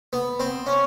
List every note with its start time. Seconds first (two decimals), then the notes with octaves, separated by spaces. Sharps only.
0.13 B3
0.40 C4
0.66 C#4